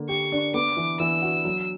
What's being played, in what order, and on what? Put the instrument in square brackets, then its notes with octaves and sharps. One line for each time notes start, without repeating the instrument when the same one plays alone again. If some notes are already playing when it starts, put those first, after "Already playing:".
Already playing: [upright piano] D3 A#3
[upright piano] G4 [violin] C#6
[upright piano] D4
[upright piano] B3 [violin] D6
[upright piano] E3
[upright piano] E3 [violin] E6
[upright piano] F#4
F#3